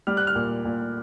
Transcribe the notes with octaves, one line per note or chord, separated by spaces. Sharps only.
G3 F6
F#6
F6
A#2
A#2